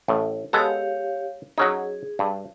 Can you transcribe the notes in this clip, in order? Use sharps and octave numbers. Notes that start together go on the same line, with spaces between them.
A1 A2
G#3 B3 G4 A4 C#5 F5
F#3 C#4 D#4 G#4
G2